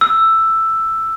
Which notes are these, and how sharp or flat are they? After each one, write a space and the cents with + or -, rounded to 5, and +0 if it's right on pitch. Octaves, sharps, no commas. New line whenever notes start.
E6 +5